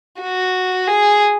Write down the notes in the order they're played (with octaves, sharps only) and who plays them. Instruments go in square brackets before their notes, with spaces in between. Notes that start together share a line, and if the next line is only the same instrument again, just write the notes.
[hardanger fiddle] F#4
G#4